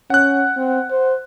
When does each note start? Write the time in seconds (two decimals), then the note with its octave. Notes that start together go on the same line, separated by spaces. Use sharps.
0.10 C#4 F#5 F#6
0.57 C4
0.90 C5